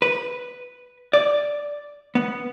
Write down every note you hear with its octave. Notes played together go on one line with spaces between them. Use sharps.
B4
D5
B3